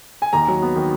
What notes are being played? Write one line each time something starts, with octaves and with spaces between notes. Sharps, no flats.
G#5
D#2 A#5
F#3
B3
D#3